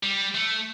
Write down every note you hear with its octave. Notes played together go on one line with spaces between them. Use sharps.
G3
A3